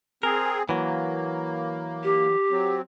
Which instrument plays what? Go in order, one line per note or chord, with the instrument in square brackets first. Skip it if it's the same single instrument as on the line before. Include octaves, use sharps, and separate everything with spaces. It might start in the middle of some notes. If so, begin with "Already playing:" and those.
[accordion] C4 G#4 [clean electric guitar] A#4
[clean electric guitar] E3 F#3 [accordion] A#3
[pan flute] G4
[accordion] F#3 C4